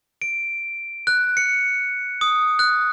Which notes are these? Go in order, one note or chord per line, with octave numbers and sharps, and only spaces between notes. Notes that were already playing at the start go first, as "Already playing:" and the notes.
D7
F#6
C#7
D#6
F#6